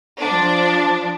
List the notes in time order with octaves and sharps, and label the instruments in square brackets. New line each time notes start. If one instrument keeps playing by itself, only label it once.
[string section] F3 D4